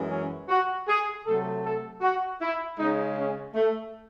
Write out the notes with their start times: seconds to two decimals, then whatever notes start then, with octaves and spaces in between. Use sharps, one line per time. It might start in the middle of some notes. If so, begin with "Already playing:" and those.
Already playing: F#2 E3 G#3
0.10 C#4
0.48 F#4
0.87 G#4
1.25 C3 F#3 A3 A4
1.63 A4
2.01 F#4
2.40 E4
2.78 C#3 G#3 D#4
3.16 C#4
3.54 A3